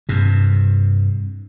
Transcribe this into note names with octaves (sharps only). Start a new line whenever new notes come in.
G2 C3